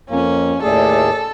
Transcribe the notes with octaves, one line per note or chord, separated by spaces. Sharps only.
F2 A#3 C#4
D#2 A2 A3 G#4 A4 D5